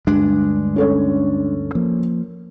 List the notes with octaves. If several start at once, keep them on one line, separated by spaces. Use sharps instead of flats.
D2 G2 G#3 D4
C#4 A4 C#5
F3 A#3